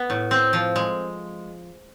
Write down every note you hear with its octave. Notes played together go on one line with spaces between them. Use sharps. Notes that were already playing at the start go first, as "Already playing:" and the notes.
Already playing: B3
A2
C4
F3
G#3